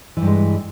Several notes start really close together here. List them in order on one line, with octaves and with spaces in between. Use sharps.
E3 G2 G#3